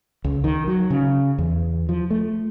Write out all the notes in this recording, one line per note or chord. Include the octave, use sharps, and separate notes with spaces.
C#2
D#3
F#3
C#3
E2
F3
A3